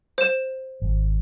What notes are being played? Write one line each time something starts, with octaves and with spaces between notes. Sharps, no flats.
C5 E7
G#1